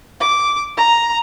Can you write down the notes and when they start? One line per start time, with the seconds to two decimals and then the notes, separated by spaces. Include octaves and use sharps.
0.21 D6
0.77 A#5